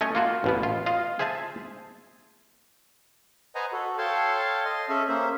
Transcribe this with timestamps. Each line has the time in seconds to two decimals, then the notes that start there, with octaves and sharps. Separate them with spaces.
0.01 A3 C#4 C#5 D#5
0.15 A#3 F4 F#4
0.44 A1 B2 B3
0.63 F4
0.86 F4 D#5 F5
1.19 G#4 C5 E5 G#5 A5
3.55 B4 C5 D#5 F#5 G#5 A#5
3.72 F#4 A4
3.98 A4 C#5 F5 G5 A5 C6
4.65 D#5 C6
4.89 C#4 G#4 A4 E5
5.08 A#3 C#4 C5 E5